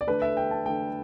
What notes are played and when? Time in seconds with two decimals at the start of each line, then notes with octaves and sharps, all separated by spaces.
0.01 D5
0.07 D3 A3 B4
0.22 E5
0.37 G5
0.51 A5
0.66 D3 A3 G5